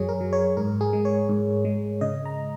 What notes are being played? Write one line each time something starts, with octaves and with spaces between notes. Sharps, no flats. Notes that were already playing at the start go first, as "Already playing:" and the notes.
Already playing: F#2 F#3 G#4 C#5
A#4
F#3
C#5
G#2 A#4
G#4
G#3
C#5
G#2
G#3
C#3 D#5
A#5